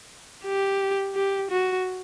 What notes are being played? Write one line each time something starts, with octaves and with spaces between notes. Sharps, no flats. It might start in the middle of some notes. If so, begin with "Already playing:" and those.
G4
G4
F#4